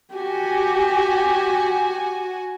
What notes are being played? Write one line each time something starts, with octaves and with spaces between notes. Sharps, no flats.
F#4 G4 G#5